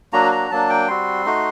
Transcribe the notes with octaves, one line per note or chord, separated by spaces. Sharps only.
F#3 A#3 D4 F#4 A#5
A#5
F#3 A#3 D4 A5
G5
G3 C4 F#4 C6
A3 D#4 F#4